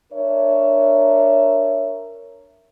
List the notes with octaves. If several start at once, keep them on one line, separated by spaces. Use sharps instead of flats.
D4 A#4 C#5 E5